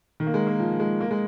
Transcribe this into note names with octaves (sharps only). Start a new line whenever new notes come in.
D#3
A#3
G#3
A#3
F3
G#3
A#3
G#3